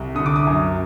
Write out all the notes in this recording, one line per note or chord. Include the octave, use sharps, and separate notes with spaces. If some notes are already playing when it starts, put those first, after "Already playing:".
Already playing: C2
D3 D#6
D6
D#6
F#2